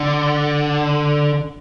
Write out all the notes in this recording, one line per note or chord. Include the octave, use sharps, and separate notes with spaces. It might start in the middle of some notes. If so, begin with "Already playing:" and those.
Already playing: D3